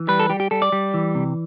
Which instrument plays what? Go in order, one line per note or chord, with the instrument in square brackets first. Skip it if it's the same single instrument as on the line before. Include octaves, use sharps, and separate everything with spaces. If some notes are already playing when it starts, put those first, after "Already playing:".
Already playing: [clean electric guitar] E3
G3 B4
A4
G3 G4
G4
G3 A4
D5
G3
E3
C3